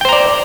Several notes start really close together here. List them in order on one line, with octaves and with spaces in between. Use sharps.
G5 C5 A#5 D5